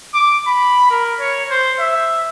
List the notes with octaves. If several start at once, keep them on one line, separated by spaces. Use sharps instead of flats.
D6
B5
A#4
C#5
C5
E5